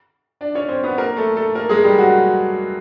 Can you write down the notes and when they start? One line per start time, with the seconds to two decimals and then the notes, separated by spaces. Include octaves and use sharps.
0.41 D4 D5
0.55 C#4 C#5
0.69 C4 C5
0.84 B3 B4
0.98 A#3 A#4
1.17 A3 A4
1.36 A3 A4
1.55 A#3 A#4
1.69 G#3 G#4
1.84 G3 G4
1.98 F#3 F#4